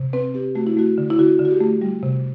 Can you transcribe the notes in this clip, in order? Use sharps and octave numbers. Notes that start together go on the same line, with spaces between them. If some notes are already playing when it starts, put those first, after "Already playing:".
Already playing: C3
C4 B4
C4 G4
A3 F#4
E4
A3 F#4
D3
E4
D3 F#4
D3
F#4
G4
A3
G3
C3